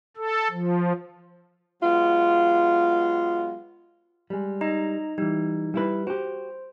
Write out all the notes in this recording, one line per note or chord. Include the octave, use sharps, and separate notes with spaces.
A4
F3
F#3 G#3 B3 F4
G3 G#3
D#4 D#5 A#5
E3 G3 D#4
G3 E4 B4
F#4 G4 C5